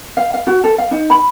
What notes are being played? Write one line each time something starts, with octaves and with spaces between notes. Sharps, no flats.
F5
F5
F#4
A4
F5
D#4
B5